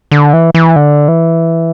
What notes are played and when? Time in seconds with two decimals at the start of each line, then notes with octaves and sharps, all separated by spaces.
0.12 D3
0.33 E3
0.55 E3
0.76 D3
1.08 E3